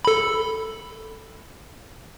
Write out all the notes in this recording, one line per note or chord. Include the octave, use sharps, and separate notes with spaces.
A4 B5